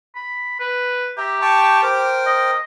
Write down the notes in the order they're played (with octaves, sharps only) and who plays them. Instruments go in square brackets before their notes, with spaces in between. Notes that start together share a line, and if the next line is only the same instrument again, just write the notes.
[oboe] B5
B4
[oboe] G4 [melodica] E5 A#5
[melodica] G5 A5 C#6
A#4 C5 G5
[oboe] D#5